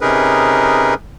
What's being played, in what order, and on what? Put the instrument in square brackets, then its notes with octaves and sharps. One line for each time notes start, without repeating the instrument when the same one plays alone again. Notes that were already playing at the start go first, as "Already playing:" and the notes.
[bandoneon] C3 C#4 D#4 G#4 A#4 B4